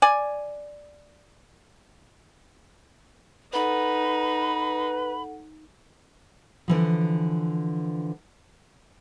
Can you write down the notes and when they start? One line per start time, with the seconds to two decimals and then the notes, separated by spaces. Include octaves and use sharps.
0.02 D5 G#5
3.53 D#4 A4 B4 F#5 B5
6.68 D3 E3 F3